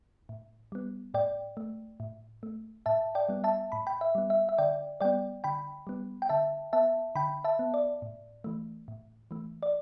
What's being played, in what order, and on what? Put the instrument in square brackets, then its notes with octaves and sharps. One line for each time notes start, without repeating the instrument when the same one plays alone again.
[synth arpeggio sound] A2
G3 B3
A2 D5 G5
A3
A2
A3
A2 E5 A5
D5 G5
G3 B3
E5 A5
A2 B5
G5 B5
E5
G3 B3
E5
E5
D3 D5 G5
G3 B3 D5 G5
D3 G5 B5
G3 B3
G5
D3 E5 A5
B3 E5 A5
D3 G5 B5
E5 A5
B3
D5
A2
E3 A3
A2
E3 A3
D5